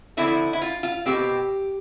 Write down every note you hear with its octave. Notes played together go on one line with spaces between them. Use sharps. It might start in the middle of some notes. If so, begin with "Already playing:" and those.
D3 F3 C4 E4
E4
F4
F4
B2 A3 C4 G4